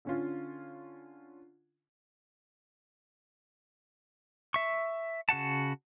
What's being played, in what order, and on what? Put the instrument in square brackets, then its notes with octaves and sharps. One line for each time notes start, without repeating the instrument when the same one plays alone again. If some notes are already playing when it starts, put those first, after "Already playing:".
[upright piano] D3 C#4 F4
[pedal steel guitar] E5 C#6
C#3 F#4 F#5 A5